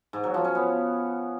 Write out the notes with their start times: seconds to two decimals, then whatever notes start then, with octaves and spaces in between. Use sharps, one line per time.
0.13 G#2
0.24 F#3
0.34 F3
0.45 C#4
0.55 B3